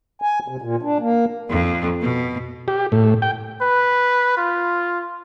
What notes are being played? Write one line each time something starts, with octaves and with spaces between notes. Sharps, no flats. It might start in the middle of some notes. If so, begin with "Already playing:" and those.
G#5
C3
A#2
D4
A#3
F2
B2
G4
A2
G5
B4
F4